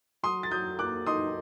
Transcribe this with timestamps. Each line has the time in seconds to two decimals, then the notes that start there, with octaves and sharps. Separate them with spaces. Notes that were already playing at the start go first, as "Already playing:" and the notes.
0.23 F#3 C6 D#6
0.43 A6
0.51 F#3 D#6 G6
0.79 A#3 D6 F#6
1.07 D#4 C6 D#6